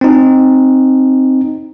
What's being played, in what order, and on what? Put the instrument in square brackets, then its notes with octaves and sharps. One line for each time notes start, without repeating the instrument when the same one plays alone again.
[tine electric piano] C4 D#4